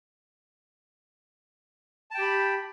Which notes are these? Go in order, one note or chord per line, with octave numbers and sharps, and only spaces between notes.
G4 G5 A5 B5